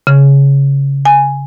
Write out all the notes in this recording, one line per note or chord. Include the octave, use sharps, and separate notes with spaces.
C#3
G#5